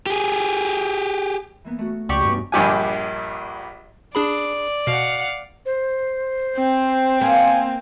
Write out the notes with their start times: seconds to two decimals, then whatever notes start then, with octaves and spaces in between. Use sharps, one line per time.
0.06 G4 G#4
1.64 E3 A#3 B3
1.79 A3 F#4
2.09 C#2 C3 F3 G4 D5 C#6
2.25 G2 B3 C#4 D#4
2.52 A#1 G2 G4 G#5
4.15 D4 G#4 D5 B5
4.87 B2 F5 F#5
5.66 C5
6.57 C4
7.21 A#3 B3 G#5